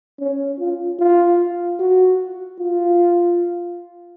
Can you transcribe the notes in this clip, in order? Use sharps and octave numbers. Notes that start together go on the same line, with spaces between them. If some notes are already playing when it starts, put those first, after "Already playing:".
C#4
F4
F4
F#4
F4